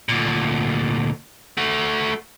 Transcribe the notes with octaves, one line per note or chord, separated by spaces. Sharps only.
D2 A#2
A3 F#4